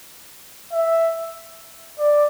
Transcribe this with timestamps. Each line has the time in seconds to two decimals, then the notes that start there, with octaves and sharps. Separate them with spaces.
0.72 E5
1.99 D5